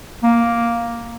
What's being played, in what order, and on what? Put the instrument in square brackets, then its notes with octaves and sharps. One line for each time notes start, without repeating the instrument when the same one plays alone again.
[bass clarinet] A#3